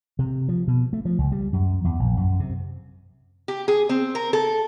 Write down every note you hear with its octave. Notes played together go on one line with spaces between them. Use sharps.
C3
F3
B2
A3
F3
C#2
G3
F#2
E2
A#1
F#2
C3
G4
G#4
C4
A#4
A4